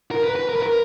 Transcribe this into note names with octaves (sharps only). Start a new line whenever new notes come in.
A#4
B4
B4
A#4
B4
A#4